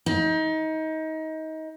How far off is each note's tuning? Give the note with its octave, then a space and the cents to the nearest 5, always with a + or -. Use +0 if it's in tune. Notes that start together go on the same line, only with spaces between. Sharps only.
D#4 +25